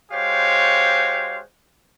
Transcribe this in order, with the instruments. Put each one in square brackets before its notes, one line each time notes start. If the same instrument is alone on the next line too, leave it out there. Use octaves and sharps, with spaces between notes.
[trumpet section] G#3 F#4 G4 C5 C#5 F5